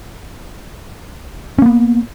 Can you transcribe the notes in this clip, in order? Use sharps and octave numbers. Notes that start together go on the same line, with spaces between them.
A#3 B3 C#4